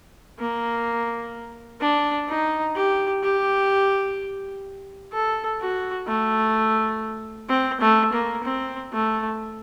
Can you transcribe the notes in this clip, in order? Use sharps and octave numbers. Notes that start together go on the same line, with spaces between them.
A#3
D4
D#4
G4
G4
A4
F#4
A3
C4
A3
A#3
C4
A3